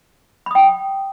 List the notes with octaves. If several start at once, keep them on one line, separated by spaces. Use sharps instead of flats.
G5 B5 D#6